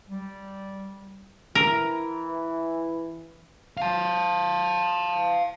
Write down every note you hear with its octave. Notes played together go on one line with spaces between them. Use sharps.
G3
E3 A#4
F5 A5